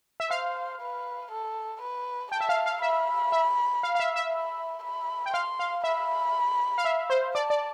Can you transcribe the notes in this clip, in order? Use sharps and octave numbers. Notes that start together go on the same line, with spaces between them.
E5
C5 F5
B4
A4
B4
G5 A5
E5
F5
F5
E5 B5
E5
F5
F5
E5
E5
B5
B5
G5
F5 C6
F5
E5 B5
F5
E5
C5
D5 A5
D5